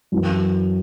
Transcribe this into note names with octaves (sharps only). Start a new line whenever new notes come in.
F#2 E3